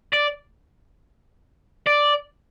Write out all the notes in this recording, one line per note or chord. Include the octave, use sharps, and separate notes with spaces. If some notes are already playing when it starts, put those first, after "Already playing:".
D5
D5